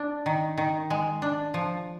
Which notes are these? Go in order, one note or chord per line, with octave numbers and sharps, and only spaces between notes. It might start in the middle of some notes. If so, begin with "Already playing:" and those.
Already playing: D4
D#3
D#3
G#3
D4
F3